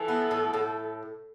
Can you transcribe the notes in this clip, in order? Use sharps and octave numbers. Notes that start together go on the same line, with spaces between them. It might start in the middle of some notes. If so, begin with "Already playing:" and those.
Already playing: E3 A4
B3
A2
A2